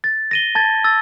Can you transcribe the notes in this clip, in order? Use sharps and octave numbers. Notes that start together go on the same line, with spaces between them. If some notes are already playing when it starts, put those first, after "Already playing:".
A6
A#6 D#7 G7
A5 G#6 A6
E6 A6